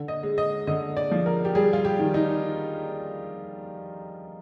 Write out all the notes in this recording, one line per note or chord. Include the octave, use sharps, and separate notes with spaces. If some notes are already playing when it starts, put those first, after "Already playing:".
Already playing: D3
D#5
G#3
D#5
D3 D#5
D5
F3
A#4
G4
G3 G#4
F4
G4
D#3
D#4